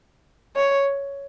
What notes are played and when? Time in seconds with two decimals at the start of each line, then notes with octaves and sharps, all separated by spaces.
0.57 C#5